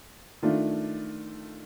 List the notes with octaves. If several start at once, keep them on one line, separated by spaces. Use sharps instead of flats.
D#3 A3 D4 F4